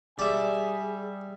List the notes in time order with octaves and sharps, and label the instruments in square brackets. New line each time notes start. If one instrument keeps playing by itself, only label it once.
[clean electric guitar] G3 E5 [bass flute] G#4 [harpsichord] D5 [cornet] G#5